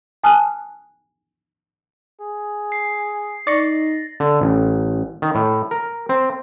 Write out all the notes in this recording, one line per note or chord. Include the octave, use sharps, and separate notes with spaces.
G#5 A5 D#6 F6 F#6
G#4
C7
D#4 D5 C#6 A6 A#6
D3
A1
D#3
A2
A#4
C4